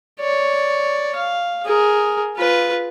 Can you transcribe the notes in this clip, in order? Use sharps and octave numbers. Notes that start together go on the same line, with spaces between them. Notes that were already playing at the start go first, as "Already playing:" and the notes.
C#5 D5
F5
G#4 A#4
F4 B4